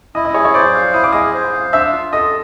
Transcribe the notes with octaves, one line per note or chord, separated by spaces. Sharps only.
E4 D#5 D#6
D#5 D#6
G#4 C#5 C#6
C#5 C#6
C5 D5 D6
F5
E4 D#6
D6
G#4 D#5 D#6
C5
F5
D4 E5 E6
F4
A4 D#5 D#6